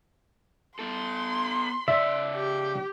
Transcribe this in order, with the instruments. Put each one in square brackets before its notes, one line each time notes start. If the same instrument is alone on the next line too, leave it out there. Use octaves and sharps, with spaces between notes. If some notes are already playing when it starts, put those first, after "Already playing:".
[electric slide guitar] B3 A4 [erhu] C6
[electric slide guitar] C#3 D5 [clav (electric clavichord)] E5
[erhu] G4